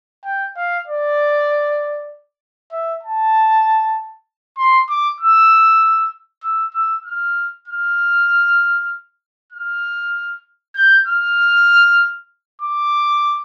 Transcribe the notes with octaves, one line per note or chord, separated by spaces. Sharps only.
G5
F5
D5
E5
A5
C6
D6
E6
E6
E6
F6
F6
F6
G6
F6
D6